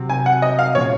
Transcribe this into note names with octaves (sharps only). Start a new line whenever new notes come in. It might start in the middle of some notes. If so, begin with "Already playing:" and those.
Already playing: C3 F#3 C4
G#5
F#5
D#5
F5
A#2 F3 G#3 C#4 C#5